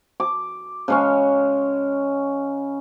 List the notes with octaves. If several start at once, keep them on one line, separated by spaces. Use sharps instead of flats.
D6
C#3 G#3 C#4